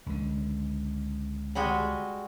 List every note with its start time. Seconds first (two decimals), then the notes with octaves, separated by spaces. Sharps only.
0.06 C#2 D3
1.55 G3 G#3 F#4